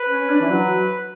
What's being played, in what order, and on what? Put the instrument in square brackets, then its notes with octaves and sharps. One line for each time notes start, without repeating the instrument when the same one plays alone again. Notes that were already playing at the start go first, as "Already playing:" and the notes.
Already playing: [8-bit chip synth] B4
[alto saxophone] C#4
D4
E3
F#3